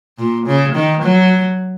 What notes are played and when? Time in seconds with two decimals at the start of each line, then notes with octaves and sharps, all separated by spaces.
0.18 A#2
0.46 C#3
0.75 D#3
1.03 F#3